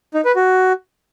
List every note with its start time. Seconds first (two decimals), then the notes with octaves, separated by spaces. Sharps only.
0.14 D#4
0.25 B4
0.36 F#4